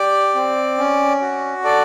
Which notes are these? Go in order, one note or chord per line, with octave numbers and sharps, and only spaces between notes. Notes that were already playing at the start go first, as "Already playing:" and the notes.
Already playing: G4 D5
C4
C#4
F#4
A4 D5